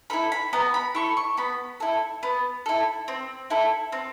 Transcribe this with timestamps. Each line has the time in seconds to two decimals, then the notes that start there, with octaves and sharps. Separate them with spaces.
0.10 E4 A4 B5
0.32 B5
0.53 B3 A#5
0.74 B5
0.95 E4 A4 C#6
1.17 C#6
1.37 B3 B5
1.80 E4 A4
2.23 B3
2.66 E4 A4
3.08 C4
3.50 E4 A4
3.92 C4